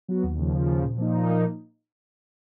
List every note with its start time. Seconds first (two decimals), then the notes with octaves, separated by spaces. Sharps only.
0.08 F#3 B3 F#4
0.24 D#2
0.37 C#3 F3
0.53 D#2
0.68 C#3 F3
0.83 A#2
0.98 F3 A#3 D#4
1.13 A#2
1.28 F3 A#3 D#4